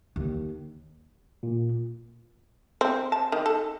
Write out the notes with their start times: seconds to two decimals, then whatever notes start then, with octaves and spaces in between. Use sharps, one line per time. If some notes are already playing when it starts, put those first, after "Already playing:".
0.16 D#2
1.43 A#2
2.81 C4
3.12 A5
3.32 D#3
3.46 A4